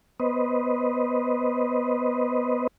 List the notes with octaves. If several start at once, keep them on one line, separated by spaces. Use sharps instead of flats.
B3 B4 C5 D#5